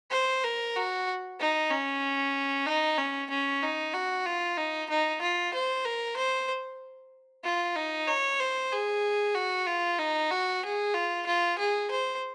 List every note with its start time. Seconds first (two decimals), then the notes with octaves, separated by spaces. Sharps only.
0.11 C5
0.44 A#4
0.76 F#4
1.40 D#4
1.70 C#4
2.67 D#4
2.98 C#4
3.30 C#4
3.63 D#4
3.93 F#4
4.26 F4
4.57 D#4
4.89 D#4
5.21 F4
5.54 C5
5.85 A#4
6.16 C5
7.44 F4
7.76 D#4
8.08 C#5
8.40 C5
8.72 G#4
9.35 F#4
9.67 F4
9.99 D#4
10.31 F#4
10.63 G#4
10.94 F4
11.26 F4
11.58 G#4
11.91 C5